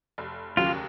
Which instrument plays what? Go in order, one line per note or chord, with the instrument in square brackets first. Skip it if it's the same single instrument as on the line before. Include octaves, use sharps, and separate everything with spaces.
[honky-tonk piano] F1
[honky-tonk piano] D#2 C#3 F#3 [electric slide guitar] F4